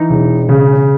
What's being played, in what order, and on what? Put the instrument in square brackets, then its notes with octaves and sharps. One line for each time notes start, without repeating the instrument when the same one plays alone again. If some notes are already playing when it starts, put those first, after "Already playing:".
Already playing: [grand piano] E3 [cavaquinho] D#4
[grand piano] E1
C#3